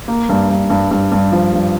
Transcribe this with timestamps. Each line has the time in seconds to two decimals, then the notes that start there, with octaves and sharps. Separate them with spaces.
0.08 A#3
0.29 G2
0.50 G2
0.70 G2
0.91 G2
1.12 G2
1.32 F3
1.53 G2